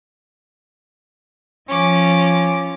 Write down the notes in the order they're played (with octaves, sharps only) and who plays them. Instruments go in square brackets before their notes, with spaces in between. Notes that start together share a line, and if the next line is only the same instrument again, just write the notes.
[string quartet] F3 [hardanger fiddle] C#4 D6